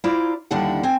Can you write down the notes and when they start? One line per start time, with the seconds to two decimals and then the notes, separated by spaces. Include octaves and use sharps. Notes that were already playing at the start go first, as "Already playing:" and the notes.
0.04 E4 F4 C5 D5 A#5
0.51 D#2 D3 G3 D4 E4 F#5
0.83 C4 G#5